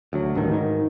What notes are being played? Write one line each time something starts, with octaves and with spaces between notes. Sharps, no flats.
D2 F#3
D1 A1 G2 D#3
G#2 D#3